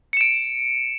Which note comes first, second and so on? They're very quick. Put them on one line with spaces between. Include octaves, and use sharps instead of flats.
C#7 E7 D7